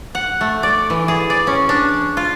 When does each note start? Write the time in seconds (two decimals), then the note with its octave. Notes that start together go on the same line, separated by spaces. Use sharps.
0.15 F#5
0.41 A3
0.63 D5
0.90 E3
1.08 G#4
1.30 D5
1.47 C#4
1.69 D4
2.17 F4